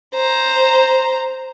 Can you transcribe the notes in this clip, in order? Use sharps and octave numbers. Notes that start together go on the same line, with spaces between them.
C5 A#5